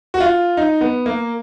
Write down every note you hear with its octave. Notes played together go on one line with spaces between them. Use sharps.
F#4
F4
D#4
B3
A#3